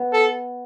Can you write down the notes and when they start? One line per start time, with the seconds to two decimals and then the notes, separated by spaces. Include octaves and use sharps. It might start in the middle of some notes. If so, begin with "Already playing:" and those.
Already playing: B3
0.13 A4